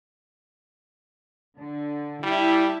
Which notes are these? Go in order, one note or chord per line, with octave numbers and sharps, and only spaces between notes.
D3
G3 E4 E5 A5